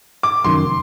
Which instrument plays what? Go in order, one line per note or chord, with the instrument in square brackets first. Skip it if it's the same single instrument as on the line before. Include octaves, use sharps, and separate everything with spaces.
[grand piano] D6
[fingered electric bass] F1 F#2 D#3 [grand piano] C6
[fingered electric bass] F1